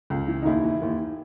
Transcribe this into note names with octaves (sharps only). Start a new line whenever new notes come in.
C#2
E3
D#4
D#2 E4
E3
D#2